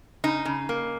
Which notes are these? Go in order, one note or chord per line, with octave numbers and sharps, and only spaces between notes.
C#3 D#4
C#3
A#3